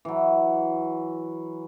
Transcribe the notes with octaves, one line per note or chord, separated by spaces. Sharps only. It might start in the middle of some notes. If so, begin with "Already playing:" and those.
E3 F#3